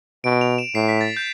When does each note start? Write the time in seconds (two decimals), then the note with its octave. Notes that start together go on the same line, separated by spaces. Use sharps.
0.24 B2 D7
0.41 F7
0.58 E7
0.75 A2 C7
0.88 B6
1.01 A6
1.17 G6